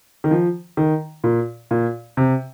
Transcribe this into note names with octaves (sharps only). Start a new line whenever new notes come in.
D#3
F3
D#3
A#2
A#2
C3